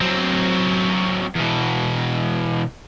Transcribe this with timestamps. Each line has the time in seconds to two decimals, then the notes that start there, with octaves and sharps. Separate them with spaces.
0.01 F#3 C4
1.36 E2 B2